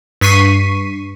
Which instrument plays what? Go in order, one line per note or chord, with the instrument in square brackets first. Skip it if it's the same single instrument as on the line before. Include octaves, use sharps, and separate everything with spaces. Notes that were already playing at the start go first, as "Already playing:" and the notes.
[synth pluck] G2 C#6 B6 C7 D#7